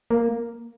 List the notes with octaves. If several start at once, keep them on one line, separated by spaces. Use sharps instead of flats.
A#3